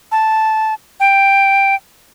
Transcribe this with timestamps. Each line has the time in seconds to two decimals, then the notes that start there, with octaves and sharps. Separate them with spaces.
0.12 A5
1.00 G5